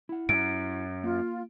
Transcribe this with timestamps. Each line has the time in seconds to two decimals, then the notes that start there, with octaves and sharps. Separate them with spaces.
0.09 E4 F#5
0.29 F#2 D7
1.04 A#3 F4